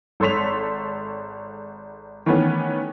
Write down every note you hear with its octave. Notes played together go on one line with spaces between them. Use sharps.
G#1 A4 C#5 C6 B6 F7
D#3 E3 A3 B3 C#4